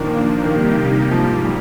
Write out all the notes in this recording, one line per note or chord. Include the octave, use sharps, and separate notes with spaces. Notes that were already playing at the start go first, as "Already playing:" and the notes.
Already playing: A#2 D#3 F3 A#3 D4
C3 D#3 G3 A#3 D#4 G4
G#2 F3 G3 A#3
G3